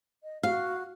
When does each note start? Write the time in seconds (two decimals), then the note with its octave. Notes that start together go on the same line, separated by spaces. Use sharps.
0.23 D#5
0.43 F#4 F5